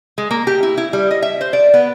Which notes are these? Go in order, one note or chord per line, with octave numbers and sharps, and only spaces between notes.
G#3
A#3
G4
E4
E4
G3
D#5
E5
C5
D5
B3